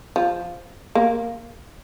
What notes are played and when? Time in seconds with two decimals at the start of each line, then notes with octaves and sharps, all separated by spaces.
0.16 F3
0.95 A#3